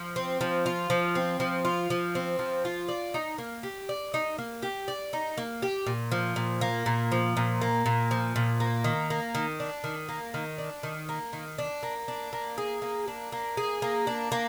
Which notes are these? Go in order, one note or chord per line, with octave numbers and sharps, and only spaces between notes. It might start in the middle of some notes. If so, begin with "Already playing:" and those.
Already playing: F3
C4
F3
F4
F3
C4
F3
F4
F3
C4
F3
F4
D5
D#4
A#3
G4
D5
D#4
A#3
G4
D5
D#4
A#3
G4
A#2
F3
A#2
A#3
A#2
F3
A#2
A#3
A#2
F3
A#2
A#3
D#3
A#3
D#3
D4
D#3
A#3
D#3
D4
D#3
A#3
D#3
D4
A#3
D4
A#3
G#4
A#3
D4
A#3
G#4
A#3
D4
A#3